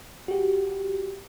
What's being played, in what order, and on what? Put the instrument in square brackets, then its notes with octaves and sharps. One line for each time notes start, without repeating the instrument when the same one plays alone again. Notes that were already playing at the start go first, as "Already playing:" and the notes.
[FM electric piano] F#4 G4